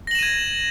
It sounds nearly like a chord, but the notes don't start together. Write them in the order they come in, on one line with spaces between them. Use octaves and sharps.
A#6 F#7 E7 D#7 G#6